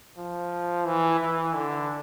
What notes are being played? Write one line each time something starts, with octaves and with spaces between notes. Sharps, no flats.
F3
E3
E3
D3